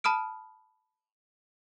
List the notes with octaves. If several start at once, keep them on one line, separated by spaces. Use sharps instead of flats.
A5 B5 D#6 F6 D7